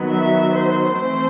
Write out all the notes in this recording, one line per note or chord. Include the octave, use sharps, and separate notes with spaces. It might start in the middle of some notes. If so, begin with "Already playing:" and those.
Already playing: D#3 F#3 B3
E5
C5
E3 A3 C4 C5